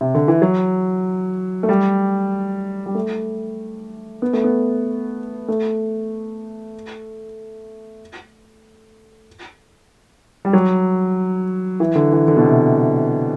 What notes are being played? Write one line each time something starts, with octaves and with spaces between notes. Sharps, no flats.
C3
D3
E3
F#3
A3
G3
G3
A3
B3
A3
B3
A3
G3
F#3
E3
D3
E3
D3
B2
C3